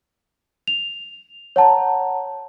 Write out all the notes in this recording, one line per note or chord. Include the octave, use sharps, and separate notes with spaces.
F7
C#5 F#5 A5 A#5